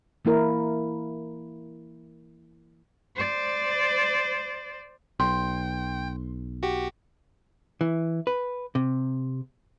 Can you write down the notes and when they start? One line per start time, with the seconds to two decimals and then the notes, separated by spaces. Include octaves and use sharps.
0.25 E3 A#3 E4 A#4
3.16 C5 D5
5.20 B1 G5 C6
6.63 F#4 G4
7.81 E3
8.27 B4
8.75 C3